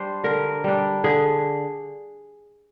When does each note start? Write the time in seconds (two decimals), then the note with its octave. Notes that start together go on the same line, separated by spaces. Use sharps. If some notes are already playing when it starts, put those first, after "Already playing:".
Already playing: G3 D4 C5
0.24 D3 A#4
0.64 G3 D4
1.04 D3 G#4